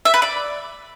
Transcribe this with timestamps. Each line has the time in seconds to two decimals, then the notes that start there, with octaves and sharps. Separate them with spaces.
0.05 E5
0.14 B4
0.22 D5